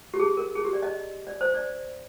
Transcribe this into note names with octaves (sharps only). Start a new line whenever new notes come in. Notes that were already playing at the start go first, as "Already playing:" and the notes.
G4
G#4
A#4
G#4
G4
D5
D#5
D5
C5
D5